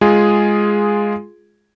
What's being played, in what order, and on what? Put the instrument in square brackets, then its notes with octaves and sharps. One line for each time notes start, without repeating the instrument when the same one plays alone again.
[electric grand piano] G#3 F4 G#4